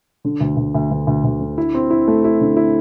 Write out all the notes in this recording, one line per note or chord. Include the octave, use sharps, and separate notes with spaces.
D3
D2
D2
D2
D2
D2
D2
D3
E4
C4
E4
A3
E4
D3
E4